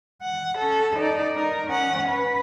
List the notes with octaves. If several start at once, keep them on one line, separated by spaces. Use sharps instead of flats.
F#5
C#4 A4
D#4 D5
D#4 A#4
C#4 F#5
B4